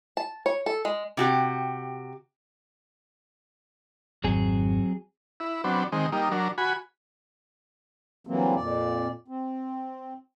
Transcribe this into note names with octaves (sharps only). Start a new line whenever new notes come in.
A5
C#5
A4
G#3
C3 F#4 G4
G#1 F2 F#3 C4 G#4
E4
F#3 B3 C4 D4
D#3 G#3 C4
G3 A#3 D#4
F#3 D4 A#4
F#4 G#5 B5
D3 E3 F#3 G3 A#3 C4
F2 A#2 D5
C4